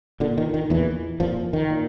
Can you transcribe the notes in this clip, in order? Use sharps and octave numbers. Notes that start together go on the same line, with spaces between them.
A#2 D3
D#3
D#3
E2 A#2 E3
F2 A#2 F3
D#3
A#2